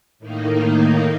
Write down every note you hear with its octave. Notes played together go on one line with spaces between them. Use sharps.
A2 D#3 A#3 D#4